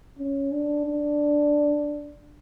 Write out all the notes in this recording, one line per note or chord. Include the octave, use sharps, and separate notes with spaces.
C#4
D4
D4